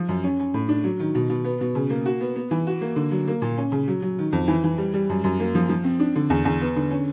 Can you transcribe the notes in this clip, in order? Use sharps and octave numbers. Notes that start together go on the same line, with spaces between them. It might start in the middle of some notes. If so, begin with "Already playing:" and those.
Already playing: F3
F#2
C#4
C#4
A2
D4
F#3
D#3
B2
B2
B3
B2
C#3
A#3
F#4
B3
B3
E3
F#4
A#3
D3
F#3
A#3
A#2
C#4
C#3
F#3
F#3
D#3
F2
E3
E3
G3
G3
F#2
F#2
A#3
F3
F3
C4
D4
D3
E2
E2
B3
D3
C#4